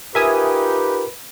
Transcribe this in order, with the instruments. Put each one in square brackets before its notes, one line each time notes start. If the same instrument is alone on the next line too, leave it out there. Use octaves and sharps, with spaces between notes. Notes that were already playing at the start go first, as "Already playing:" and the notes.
[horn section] D#4 F4 G4 [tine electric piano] A#4 [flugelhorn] B4 [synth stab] E5 G#5 D#6